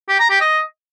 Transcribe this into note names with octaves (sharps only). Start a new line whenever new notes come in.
G4
A#5
G4
D#5